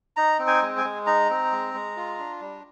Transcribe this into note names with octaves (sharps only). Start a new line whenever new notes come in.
D#4 A#5
C4
G#5
G#3
G#5
G#3
D#4 A#5
C4
G#3
G#3
F4
D4
G3